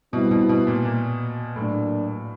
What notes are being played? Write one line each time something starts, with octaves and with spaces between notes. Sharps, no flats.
B2 G3 C4 E4
B2
B2
A#2
A#2
A2 F#3 A#3 D4